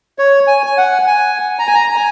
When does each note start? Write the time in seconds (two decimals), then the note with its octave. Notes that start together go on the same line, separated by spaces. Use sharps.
0.19 C#5
0.47 G#5
0.66 G#5
0.77 F#5
1.07 G#5
1.59 A#5
1.67 G#5
1.75 A#5
1.90 A#5
1.96 G#5